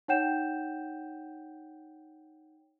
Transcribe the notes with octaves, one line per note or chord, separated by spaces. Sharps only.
D#4 C#5 F#5 G5 G6 E7